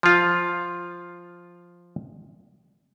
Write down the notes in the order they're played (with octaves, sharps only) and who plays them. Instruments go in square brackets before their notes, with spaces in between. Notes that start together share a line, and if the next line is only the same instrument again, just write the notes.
[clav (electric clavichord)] F3 F4